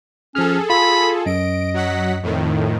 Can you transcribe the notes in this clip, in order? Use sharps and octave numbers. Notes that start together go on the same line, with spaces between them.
F3 C#4 G#4 A4 F6
F4 B5
F#2 D#5 D7
F#3 F#5 B6
F2 A2 D#3